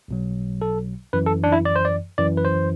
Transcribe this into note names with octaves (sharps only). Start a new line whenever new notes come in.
B1 B2 F#3
A4
F#2 E3 B4
A4
D4
E4
D5
C5
D5
F#2 E3 D5
B4
C5